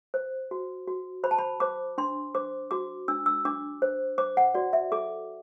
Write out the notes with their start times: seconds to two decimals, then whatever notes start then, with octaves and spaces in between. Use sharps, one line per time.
0.14 C5
0.51 F#4
0.88 F#4
1.24 C5 B5
1.31 A5
1.38 B5
1.60 C5 D6
1.98 D4 C6
2.35 C5 D6
2.71 F#4 D6
3.08 D4 E6
3.26 E6
3.45 D4 D6
3.82 C5
4.18 C5 D6
4.37 F#5
4.54 F#4 D5
4.73 E5
4.92 A4 D6